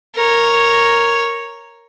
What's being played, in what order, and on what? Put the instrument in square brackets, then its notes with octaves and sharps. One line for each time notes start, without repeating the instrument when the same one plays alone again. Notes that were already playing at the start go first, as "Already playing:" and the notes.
[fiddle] A#4 C#5